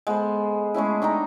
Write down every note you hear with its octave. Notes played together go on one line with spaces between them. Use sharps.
G#3 B3 A4 C5
G#3 A3 C#4 E4
D4 D#4 G5 A#5